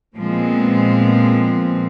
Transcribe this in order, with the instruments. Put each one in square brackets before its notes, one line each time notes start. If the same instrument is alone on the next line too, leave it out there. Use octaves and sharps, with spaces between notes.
[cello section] A#2 F3 G#3 B3 C4